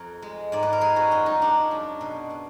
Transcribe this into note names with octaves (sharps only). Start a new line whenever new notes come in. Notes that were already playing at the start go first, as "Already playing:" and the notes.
Already playing: F2 A#4
G#3
G#2 D5
B4
A#4
G#3 G#4
F#4
F#2 F4
D#4
G#3 D4
F#2
B2
B2